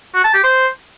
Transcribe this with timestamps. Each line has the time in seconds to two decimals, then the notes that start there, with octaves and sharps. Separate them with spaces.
0.15 F#4
0.24 A5
0.34 G4
0.44 C5